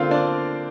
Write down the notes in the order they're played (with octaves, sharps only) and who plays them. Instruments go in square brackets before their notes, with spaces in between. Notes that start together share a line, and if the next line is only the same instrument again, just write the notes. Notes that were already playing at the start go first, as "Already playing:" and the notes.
Already playing: [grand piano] D3 A#3 C4 F4 C5 F5
D4 D5